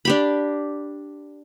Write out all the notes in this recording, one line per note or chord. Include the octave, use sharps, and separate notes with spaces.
D4 G4 B5